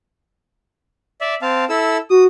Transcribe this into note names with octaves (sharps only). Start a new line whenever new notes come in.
D5 E5
C4 F5 A5
E4 A4 E6
F#4 D#6